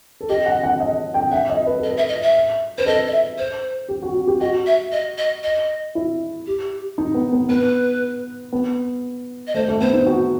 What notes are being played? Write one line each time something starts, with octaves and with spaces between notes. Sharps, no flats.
A4
G4 D#5
F#5
F#5
D#5
G5
E5 F#5
D#5
B4
A4 D#5
B4
E5
D#5
E5
B4 C5
A4 D#5
D#5
E5
C5
G4
F#4
F#4
G4
F#4 D#5
E5
D#5
D#5
D#5
E4
G4
D#4
B3
B3
B3 B4
B3
D#5
A3 C5
A3
B3 C5
D#4
F#4